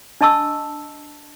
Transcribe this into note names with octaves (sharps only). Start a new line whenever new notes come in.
D4 D#5 A5 C#6 E6